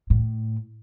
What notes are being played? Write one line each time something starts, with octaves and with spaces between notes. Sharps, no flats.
A2